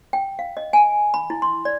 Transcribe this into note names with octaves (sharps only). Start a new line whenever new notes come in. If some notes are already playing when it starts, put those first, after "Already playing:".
G5
F5
D#5
G#5
B5
E4
C6
D5